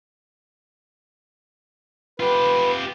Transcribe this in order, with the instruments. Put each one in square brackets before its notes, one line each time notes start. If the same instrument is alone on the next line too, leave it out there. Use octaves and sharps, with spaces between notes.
[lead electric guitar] F4 G4 [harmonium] B4